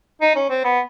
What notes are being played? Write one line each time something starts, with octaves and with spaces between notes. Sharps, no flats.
D#4
C#4
C4
B3